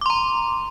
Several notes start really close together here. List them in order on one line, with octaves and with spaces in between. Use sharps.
D6 C6 A#5